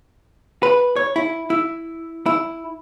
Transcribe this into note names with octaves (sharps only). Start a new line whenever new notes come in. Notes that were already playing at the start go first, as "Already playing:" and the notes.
B4
C#5
E4
E4
E4